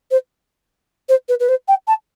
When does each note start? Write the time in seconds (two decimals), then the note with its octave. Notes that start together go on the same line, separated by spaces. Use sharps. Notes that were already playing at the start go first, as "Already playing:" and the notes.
0.11 C5
1.09 C5
1.29 B4
1.40 B4
1.49 C5
1.68 G5
1.88 A5